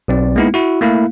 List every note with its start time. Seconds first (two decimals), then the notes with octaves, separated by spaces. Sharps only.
0.08 B1 C4 D5
0.36 G#3 A#3 B3 D#4 E4
0.54 E4 F#4
0.81 A3 A#3 E4 F5